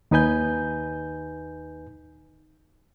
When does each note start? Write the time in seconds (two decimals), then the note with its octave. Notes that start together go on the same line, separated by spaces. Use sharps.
0.11 D#2 D#4 B4 G#5 G6